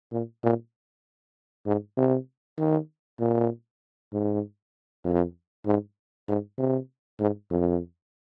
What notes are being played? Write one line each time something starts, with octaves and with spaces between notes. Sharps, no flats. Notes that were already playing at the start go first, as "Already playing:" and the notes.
A#2
A#2
G#2
C3
D#3
A#2
G#2
F2
G#2
G#2
C3
G#2
F2